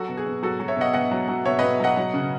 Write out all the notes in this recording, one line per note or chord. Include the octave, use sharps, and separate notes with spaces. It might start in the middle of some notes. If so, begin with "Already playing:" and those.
Already playing: F#3 F#4 A4
B2
G#4
B2
F#3 F#4 A4
F#3
C#5 E5
B2 D#5 F#5
B2 D#5 F#5
F#3
F#3
B2 C#5 E5
B2 B4 D#5
F#3 D#5 F#5
F#3
C#3